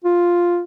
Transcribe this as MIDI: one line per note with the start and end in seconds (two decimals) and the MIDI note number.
0.04 0.62 65